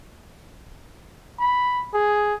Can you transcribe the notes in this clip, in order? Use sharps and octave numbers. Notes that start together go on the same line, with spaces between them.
B5
G#4